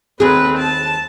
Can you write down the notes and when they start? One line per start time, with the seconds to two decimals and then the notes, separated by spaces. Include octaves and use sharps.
0.20 D#2 C4 G#4 B4
0.58 A5